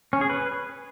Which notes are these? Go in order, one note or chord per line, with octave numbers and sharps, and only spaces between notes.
C#4
G#4
B4